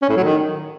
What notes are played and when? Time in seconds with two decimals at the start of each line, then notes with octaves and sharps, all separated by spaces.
0.02 C#4
0.09 A2
0.16 F#3
0.24 D#3